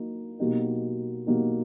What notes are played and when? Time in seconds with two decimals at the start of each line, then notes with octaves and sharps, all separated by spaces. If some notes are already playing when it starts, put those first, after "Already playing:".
Already playing: F#3 A#3 D#4
0.39 B2 F#3 A#3 D#4 G4
1.26 B2 F#3 A#3 D#4 G4